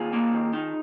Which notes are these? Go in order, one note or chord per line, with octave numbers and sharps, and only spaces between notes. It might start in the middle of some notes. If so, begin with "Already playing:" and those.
Already playing: D#2 F4 G#4
A#3
D#3
D#4